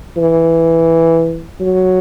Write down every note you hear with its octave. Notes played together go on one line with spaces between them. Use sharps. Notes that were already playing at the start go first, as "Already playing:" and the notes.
E3
F#3